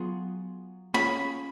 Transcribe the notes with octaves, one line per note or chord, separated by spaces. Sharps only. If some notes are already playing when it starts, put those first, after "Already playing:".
Already playing: F#3 B3 F4 G#4
A#3 C#4 F4 G#4 C#5 B5